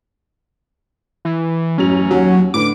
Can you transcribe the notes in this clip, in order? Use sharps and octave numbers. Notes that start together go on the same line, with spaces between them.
E3
A1 F#2 C#4 F7
D#2 F#3
A2 D3 B4 D6 D7